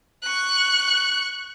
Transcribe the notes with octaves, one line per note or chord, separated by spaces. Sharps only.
C#6 F#6